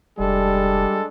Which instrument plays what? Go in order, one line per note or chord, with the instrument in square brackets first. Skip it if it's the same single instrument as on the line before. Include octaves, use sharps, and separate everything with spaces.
[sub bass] F1 [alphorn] G3 [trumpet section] G#3 D4 A4